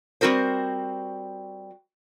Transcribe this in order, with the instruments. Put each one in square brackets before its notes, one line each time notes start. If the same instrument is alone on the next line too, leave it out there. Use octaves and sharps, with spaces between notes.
[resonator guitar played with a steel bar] G3 C4 F#4 A#4 C5